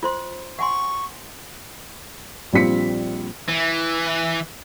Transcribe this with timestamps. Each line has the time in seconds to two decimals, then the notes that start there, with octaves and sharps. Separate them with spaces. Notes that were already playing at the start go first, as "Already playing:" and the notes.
0.03 F4 C5 C6
0.59 F#5 G#5 C6 C#6
2.53 A#1 G3 C4 F4 B6 C#7
3.49 E3